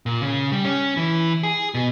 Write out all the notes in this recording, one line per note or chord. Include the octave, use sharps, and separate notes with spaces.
A#2
C#3
G3
C#4
E3
G#4
B2